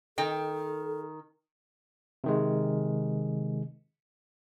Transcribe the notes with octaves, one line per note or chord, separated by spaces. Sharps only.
D#3 A4 G5
C3 D#3 G#3